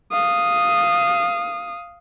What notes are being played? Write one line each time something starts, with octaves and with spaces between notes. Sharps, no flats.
F5 D#6